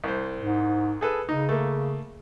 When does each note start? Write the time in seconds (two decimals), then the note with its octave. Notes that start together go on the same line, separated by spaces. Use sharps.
0.04 C2 C5
0.40 G#2
1.01 G#4 A4 B4
1.29 C#3 D#4
1.49 A3 A#3